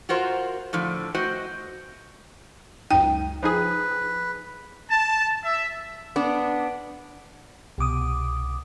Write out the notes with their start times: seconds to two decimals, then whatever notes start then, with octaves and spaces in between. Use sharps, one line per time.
0.09 F4 F#4 A#4 C5
0.73 A2 D3 F3
1.15 A3 F#4 C5 D#5 G5
2.91 C#2 F#2 D#4 G5
3.43 F3 D#4 G#4 B4
4.91 A5
5.44 E5
6.16 B3 D4
7.78 C2 B2 D6 D#6